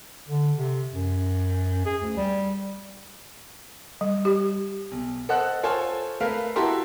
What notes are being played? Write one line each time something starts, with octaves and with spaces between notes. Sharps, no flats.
D3
C3
F#2
G#4
D2
G3
G3
G4
B1
A4 C5 D#5 F#5 F#6
F4 A4 C5 C#5 G#5 A5
A3 A#4 B4 F5
E4 F#4 G4 A4 A#5 C6